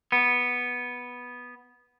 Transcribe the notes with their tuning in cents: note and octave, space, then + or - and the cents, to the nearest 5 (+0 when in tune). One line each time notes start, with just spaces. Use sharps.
B3 -5